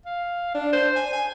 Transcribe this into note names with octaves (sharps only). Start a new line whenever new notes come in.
F5
D4
C5
G#5
G#5